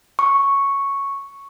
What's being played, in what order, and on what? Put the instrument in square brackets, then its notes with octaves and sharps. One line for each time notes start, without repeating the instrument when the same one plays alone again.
[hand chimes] C#6